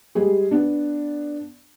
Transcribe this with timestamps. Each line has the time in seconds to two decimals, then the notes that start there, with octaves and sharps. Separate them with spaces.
0.15 G3 G#3 G#4
0.51 B3 D4